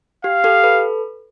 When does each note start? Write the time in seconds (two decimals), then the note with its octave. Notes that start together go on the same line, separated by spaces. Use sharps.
0.24 G4 F5
0.44 G4 A4
0.64 A4 B4